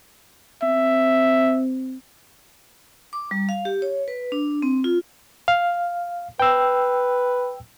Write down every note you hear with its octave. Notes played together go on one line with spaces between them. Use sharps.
C4 E5
D6
G3
F5
G4
C#5
B4
D4
C4
F4
F5
B4 G5 E6